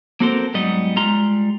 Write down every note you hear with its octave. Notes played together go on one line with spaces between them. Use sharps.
A#3 C4 F#4 A4 A#4 C5
G#2 F#3 G3 B3 D#5
G3 G#3 F4 A#5 C6